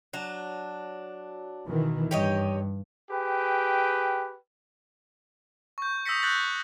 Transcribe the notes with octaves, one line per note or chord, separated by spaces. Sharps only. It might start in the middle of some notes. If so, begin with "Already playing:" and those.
F#3 D4
B2 D#3 E3
G2 G4 C#5 D#5
G4 G#4 B4 G5
C#6 G6
D#6 E6 G6 A#6 B6 C#7
E6 F#6 G6 A6 A#6 F#7